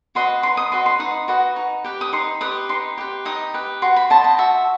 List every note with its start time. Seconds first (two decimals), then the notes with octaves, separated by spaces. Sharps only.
0.15 F#4 B4 D#5 C6
0.43 D#4 C6
0.57 D#6
0.72 F#4 B4 D#5 C6
0.86 C6
0.99 D#4 D#6
1.28 F#4 B4 D#5
1.56 D#4
1.84 G4 B4
2.01 D#6
2.13 D#4 C6
2.41 G4 B4 D#6
2.69 D#4 C6
2.98 G4 B4
3.25 D#4 D#6
3.54 G4 B4
3.82 F#4 C6
3.96 B5
4.10 C5 D#5 A5
4.24 A5
4.38 F#4 E5